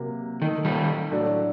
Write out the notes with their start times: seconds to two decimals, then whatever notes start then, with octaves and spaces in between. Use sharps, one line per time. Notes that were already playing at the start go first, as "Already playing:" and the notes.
Already playing: C3 F#3 A#3
0.42 D#3 A3 D#4 A4
0.65 D#3 G3
1.11 A2 F#3 A3 D4 A4